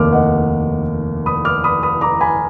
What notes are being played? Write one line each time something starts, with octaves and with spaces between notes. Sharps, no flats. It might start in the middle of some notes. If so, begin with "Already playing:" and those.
Already playing: F1 D#2 D#3 A#3 D6 F6
D#5 F#5
B5 D#6
D6 F6
B5 D#6
B5 D#6
A#5 D6
G#5 B5